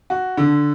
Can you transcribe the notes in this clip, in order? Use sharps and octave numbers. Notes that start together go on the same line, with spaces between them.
F#4
D3